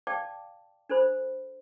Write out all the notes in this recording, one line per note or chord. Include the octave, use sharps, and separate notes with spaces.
D5 F5 G5 A5 D6
D4 A4 C5 B5